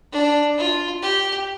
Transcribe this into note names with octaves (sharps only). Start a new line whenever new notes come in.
D4
F4
G4